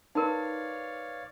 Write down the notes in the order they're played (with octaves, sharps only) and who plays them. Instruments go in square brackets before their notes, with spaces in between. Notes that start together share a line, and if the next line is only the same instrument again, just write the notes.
[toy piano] D#4 A#4 [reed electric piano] B4 C6 [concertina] C#5 D5 F5